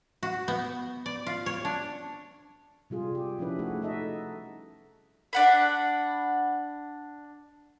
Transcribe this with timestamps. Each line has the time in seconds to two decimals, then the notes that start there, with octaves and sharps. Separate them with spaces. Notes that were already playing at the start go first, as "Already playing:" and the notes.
0.23 F#4
0.48 B3
1.06 D5
1.26 F4
1.46 C#5
1.65 D4
2.90 C3 G3 F4 G#4
3.15 G4
3.39 F3 C#4 D4 E4 B4
3.59 A3 D#4 F#4 G#4
3.82 D#4 F#4 A4 D#5 E5
5.33 D4 F#5 B5